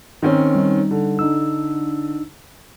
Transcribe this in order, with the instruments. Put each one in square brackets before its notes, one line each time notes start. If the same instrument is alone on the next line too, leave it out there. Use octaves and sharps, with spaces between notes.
[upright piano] D#3 C4 C#4
[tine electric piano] G3 D#4
[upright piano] D3
[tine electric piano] D4 D#4 E6